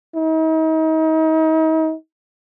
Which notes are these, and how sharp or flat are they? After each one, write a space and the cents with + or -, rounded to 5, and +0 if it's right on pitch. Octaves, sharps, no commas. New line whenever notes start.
D#4 +40